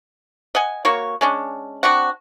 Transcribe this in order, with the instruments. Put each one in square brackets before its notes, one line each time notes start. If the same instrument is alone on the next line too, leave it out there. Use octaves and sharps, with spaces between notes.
[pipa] D#5 F#5 G#5
A#3 F#4 C#5
G#3 C#4 D4
C4 D4 F#4 F#5